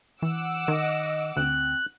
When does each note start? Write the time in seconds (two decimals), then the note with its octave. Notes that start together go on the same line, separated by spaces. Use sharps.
0.22 E3 F#5 D6 E6
0.68 D#3 D#5
1.37 D2 C4 F#6